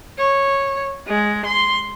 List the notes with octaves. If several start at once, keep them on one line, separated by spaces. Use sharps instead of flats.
C#5
G#3
C6